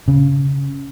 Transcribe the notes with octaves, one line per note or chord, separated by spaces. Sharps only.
C#3